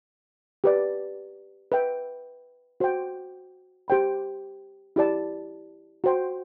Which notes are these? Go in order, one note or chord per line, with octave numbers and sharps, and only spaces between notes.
G4 B4 D5
B4 E5 G5
F#4 C5 G5
G4 C5 G5 B5
E4 G4 D5 A5
F#4 C5 G5